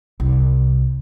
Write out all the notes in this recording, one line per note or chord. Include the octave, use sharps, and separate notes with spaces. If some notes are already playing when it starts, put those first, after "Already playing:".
C2